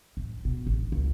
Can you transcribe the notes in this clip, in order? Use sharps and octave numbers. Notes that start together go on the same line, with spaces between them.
A2
B2
A1
C#2